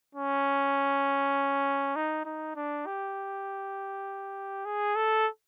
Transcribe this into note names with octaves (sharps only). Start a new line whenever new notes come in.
C#4
D#4
D#4
D4
G4
G#4
A4